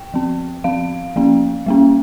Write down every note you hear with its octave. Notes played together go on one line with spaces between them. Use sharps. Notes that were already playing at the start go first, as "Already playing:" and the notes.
Already playing: G5
F3 C4
F3 C4 F5
F3 A#3 C#4
G3 A#3 C#4